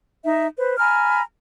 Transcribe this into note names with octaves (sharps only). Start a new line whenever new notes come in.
D#4 E5
B4 C5
G#5 A#5 B5 F6